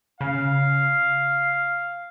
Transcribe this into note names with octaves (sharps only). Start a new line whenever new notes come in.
C#3 F5